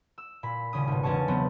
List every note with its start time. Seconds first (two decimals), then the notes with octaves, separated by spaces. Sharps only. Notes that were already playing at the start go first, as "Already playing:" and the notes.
0.18 E6
0.43 A#2 B5
0.73 D#1 C#3 C#4 D#6
0.88 G#1 B2
1.03 E1 C#4 G#4 A5 C#6
1.28 C#3 F#3 A3 B3 C4